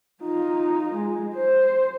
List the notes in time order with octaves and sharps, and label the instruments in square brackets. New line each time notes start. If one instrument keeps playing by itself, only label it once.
[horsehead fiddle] D#4 F4
G#3
C5